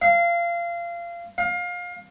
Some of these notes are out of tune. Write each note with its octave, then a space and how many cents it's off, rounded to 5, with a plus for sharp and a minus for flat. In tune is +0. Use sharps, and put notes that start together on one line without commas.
F5 -25
F5 +25